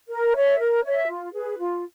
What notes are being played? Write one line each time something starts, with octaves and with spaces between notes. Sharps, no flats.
A#4
C#5 E5
A#4
C#5 E5
F4
G#4 B4
F4